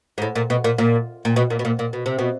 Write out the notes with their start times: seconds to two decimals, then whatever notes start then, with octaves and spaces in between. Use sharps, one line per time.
0.18 G#2
0.22 A2
0.35 A#2
0.50 B2
0.64 A#2
0.78 A#2
1.25 A#2
1.36 B2
1.50 A#2
1.59 B2
1.65 A#2
1.79 A#2
1.93 B2
2.06 C3
2.19 B2